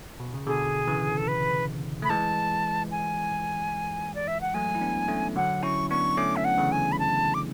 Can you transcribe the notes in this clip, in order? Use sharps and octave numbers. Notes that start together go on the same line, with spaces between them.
B2
C#3
B2 D3 G#4
C#3 E3
A4
B4
A3 B5
E3 G#3 A5
G#5
D5
E5
F#5
F#3 A3 G#5
E4
B3 D4
A3 C#4
D3 F#3 F#5
C#4 E4 C#6
B3 D4 C#6
A3 C#4 D6
E5
F#5
C#3 E3
G#5
B5
A5
D6